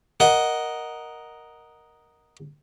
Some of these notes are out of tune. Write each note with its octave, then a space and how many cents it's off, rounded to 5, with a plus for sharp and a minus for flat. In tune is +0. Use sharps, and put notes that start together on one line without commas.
A#4 +5 D#5 +0 F#5 +0